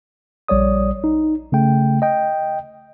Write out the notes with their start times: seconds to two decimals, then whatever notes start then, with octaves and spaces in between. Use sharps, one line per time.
0.48 A#1 G3 C#5 D5 D#6
1.04 D#4
1.52 C#3 A3 G5
2.02 D#5 G5